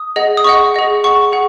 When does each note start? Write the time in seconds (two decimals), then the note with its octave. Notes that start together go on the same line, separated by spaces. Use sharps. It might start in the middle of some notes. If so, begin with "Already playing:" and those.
Already playing: D#6
0.16 G#4 D#5 F#5
0.37 D#6
0.44 G#4 D#5 F#5 C#6
0.74 G#4 D#5 F#5
1.04 G#4 F#5 C#6
1.32 G#4 F#5